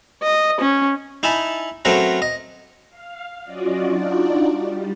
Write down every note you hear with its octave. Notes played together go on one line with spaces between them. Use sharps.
D#5
C#4
D#4 E4 G#5 A5 B5
F#3 A3 C4 C#4 A#4 B4
D#5
F5
F#3 C#4 F4 F#4 D5 D#5
D4 D#4 F4 F#4 D5
G3